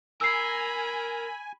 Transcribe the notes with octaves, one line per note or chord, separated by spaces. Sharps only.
A#4 G#5 B5 E6 C7